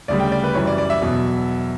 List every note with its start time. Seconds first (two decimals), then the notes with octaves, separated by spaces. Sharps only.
0.08 D2 C#3 G3 D5
0.20 G5
0.32 D5
0.44 B4
0.55 F#2 E3 G3 C#5
0.67 D5
0.78 D5
0.90 E5
1.02 E2 B2 F#3